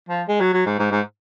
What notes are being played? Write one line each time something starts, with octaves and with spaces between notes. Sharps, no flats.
F3
G#3
F#3
F#3
G#2
G#2
G#2